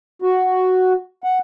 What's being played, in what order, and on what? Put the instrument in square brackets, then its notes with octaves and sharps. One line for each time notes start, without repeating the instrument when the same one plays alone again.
[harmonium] F#4
F#5